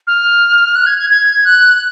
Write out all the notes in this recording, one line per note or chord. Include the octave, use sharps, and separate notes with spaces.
F6
F#6
G#6
G#6
G#6
F#6